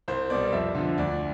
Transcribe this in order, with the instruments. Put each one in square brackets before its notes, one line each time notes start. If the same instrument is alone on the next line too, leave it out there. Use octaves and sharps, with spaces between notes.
[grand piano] C2 C5
B2 G3 D5
D5
F2 E5
D3 F3 E5
D2 D5